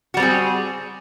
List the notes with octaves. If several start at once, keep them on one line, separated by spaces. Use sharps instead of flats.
G3 C4 F#4 G#4